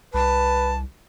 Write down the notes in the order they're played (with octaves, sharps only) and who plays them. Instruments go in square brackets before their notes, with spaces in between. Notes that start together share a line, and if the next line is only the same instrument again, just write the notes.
[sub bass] C2 [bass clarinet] B4 [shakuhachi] A5